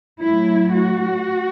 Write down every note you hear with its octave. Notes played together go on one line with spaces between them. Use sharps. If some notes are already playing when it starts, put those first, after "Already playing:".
A2 F#3 A3 E4
F#4